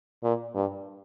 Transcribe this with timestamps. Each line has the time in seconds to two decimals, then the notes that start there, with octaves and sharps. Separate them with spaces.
0.23 A#2
0.55 G2